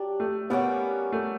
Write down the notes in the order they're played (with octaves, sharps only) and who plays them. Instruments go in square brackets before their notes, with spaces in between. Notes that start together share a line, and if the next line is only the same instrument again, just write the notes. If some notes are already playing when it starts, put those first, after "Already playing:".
Already playing: [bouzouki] F#3 D4 G4
[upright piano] A3
[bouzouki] G3 A#3 C#4 F#4 [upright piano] B3
[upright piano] A3